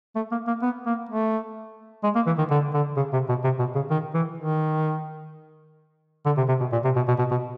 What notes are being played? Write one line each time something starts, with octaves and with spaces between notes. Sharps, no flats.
A3
A#3
A#3
B3
A#3
A3
G#3
A#3
E3
D#3
D3
D3
C#3
C3
B2
C3
B2
C#3
D#3
E3
D#3
D3
C3
C3
B2
A#2
C3
B2
B2
B2
B2